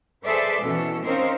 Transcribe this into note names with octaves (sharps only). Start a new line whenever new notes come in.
G#4 A4 B4 C5 D5 E5
B2 E3 C#4 A4
C4 C#4 D#4 A#4 C5 F5